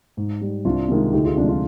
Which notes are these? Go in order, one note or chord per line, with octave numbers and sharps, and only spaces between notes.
G#2
G3
C2 D4 F4
C3 D#3 G#3
D2 D#4 G4
F4 G#4
C3 F3 G#3 D4 F4
D4 F4